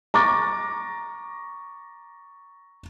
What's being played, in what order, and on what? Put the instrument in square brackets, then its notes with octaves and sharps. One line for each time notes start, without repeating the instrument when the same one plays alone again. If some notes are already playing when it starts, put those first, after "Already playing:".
[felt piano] A#5 C#6 D6 A6